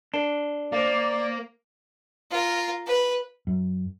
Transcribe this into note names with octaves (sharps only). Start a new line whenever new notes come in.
D4 A#4 C7 G7
A#3 C5 D5 F5
F4 A#4
B4
F#2